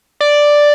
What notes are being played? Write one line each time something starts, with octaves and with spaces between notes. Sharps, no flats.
D5